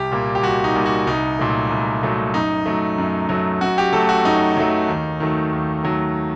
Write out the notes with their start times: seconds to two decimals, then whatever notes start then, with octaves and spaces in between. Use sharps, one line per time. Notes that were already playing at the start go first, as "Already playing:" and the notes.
Already playing: C2 G4
0.11 A#2 G3 A#3
0.35 G4
0.43 C2 F#4
0.64 D#4
0.75 A#2 G3 A#3
0.86 F#4
1.07 C2 D#4
1.39 A#2 F#3 A3
1.70 C2
2.03 A#2 F#3 A3
2.34 F#2 D#4
2.66 F#3 A3
2.98 F#2
3.29 F#3 A3
3.61 F#2 F#4
3.78 G4
3.93 F#3 A3 A4
4.09 F#4
4.25 F#2 D#4
4.57 F#3 A3
4.88 D#2
5.20 D#3 F#3 A3
5.53 D#2
5.84 D#3 F#3 A3